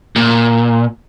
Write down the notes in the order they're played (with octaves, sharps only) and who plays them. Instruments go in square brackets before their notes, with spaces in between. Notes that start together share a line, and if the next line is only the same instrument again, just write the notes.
[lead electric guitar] A#2